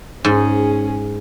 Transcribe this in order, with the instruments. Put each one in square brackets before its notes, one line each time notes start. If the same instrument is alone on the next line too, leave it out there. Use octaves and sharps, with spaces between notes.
[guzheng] G#2 [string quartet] C#4 G#4